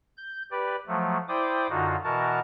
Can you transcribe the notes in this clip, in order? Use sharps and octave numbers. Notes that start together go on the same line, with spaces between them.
G6
G4 B4 D5
F3 F#3 A3
E4 C5 D5 G5 D6 D#6
F#2 D3 D#4 F4 F#4
B2 E3 F#4 A#4 A5